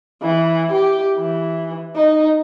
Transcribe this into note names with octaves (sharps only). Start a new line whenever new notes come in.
E3
G4
E3
D#4